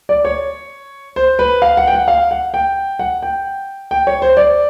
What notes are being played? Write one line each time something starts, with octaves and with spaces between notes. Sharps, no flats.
D5
C#5
C5
B4
F5
F#5
G5
F#5
F5
F#5
G5
F#5
G5
G5
C#5
C5
D5